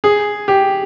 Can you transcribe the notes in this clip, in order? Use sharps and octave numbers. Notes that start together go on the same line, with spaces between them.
G#4
G4